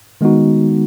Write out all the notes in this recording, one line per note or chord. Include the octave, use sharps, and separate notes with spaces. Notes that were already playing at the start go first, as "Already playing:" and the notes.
D#3 G#3 B3 D#4 F#4